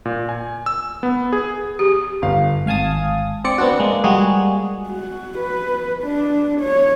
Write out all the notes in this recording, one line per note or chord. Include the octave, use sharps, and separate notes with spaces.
A#2
G#5
E6
B3
G#4
G4
G1 F5
G#1 F5 G#5 A5 D#6
C4 D5 C#7
B3 C4 D4 F#4
G#3 A#3
G3 G#3 A#3 F#4 G#4
F#4
B4
D4
C#5